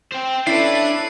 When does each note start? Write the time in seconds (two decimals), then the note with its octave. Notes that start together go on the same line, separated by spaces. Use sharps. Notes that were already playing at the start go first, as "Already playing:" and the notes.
0.12 C5 G5
0.47 C#4 D4 E4 A4 B4 D5 C7